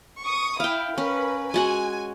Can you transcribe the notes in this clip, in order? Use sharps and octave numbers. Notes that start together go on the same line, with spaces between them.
C#6 D#6
E4 F5 G5
C#4 A#4 B4
G#3 F#4 F#5 G#5